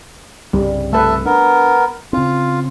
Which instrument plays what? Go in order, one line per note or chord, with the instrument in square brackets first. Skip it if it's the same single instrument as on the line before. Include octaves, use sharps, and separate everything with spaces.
[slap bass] C2 G2 C#3 [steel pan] G3
[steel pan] A3 B4 [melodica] A4 E5 A5
[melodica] B3 A#4 [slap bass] D4
[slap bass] C#3 C4 [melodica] F4